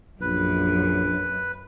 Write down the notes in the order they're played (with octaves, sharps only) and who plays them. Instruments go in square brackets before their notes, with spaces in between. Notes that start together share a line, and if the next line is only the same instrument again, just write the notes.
[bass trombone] A#1 [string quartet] F#2 [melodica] B4